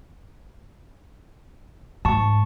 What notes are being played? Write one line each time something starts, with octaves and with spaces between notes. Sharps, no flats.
G#2 A5 C#6